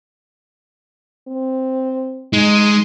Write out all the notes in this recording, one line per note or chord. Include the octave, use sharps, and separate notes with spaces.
C4
G#3 D#4